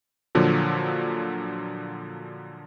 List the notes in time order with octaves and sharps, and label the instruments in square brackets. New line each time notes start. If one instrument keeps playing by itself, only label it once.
[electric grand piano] A#2 D3 F3 F#3